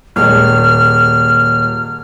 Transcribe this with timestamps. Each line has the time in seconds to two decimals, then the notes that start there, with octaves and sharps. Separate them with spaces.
0.16 D#1 G#3 F6